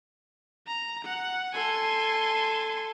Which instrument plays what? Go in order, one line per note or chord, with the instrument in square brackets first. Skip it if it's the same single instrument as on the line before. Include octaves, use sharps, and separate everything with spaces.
[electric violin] A#5
F#5
[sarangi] A4 [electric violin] G#5 C6